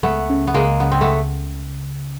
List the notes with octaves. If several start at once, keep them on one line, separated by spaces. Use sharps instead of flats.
C#2 A3 B3
C#3
B3
C#2 G#3 A#3
C#3 B3
C4
A3 B3